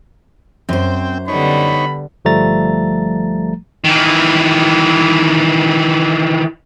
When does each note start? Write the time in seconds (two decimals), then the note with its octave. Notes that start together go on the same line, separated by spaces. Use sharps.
0.69 F#2 C4 C5 G5
1.28 D3 G3 B3 D#4 C#5 B5
2.25 G1 F3 G3 A3 A#5 A6
3.85 D#3 E3